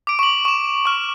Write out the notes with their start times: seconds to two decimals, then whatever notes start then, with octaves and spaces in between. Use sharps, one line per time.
0.07 D6 D7
0.19 C#6 F#7
0.45 C#6 E7
0.85 C#6 F6